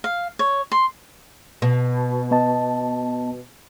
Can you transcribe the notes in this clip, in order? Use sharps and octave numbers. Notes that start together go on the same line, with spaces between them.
F5
C#5
C6
B2
B3 D#5 A5